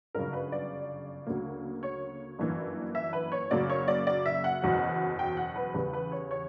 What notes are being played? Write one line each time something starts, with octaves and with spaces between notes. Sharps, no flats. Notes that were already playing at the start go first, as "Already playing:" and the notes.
G1 F#2 C#3 A#4
B4
D5
D2 C#3 F#3 A#3
C#5
G1 F#2 E3 A#3
E5
B4
C#5
F#2 C#3 F#3 A#3 D5
C#5
D5
D5
E5
F#5
F#1 E2 B2 F#3
G5
F#5
B4
E2 C#3 G3 B4
B4
C#5
C#5